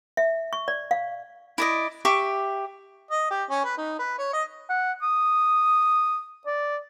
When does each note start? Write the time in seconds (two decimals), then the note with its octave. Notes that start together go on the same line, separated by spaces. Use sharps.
0.17 E5
0.53 C#6
0.68 D5
0.91 F5
1.58 E4 D5 D#5
2.05 G4 E5 C#6 D6
3.11 D#5
3.31 G4
3.50 C#4
3.64 B4
3.77 D#4
3.99 B4
4.18 C#5
4.33 D#5
4.69 F#5
5.02 D#6
6.46 D5